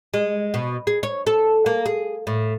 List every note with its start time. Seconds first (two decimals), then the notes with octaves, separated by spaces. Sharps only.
0.14 G#3
0.54 B2
0.87 G#4
1.03 C#5
1.27 A4
1.66 A#3
1.86 G#4
2.27 A2